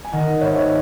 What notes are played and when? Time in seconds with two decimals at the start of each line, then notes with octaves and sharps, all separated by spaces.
0.05 G#5
0.12 D#3 D#5 F#5
0.26 D#5 F#5
0.41 G#1 C#5 E5
0.55 C#5 E5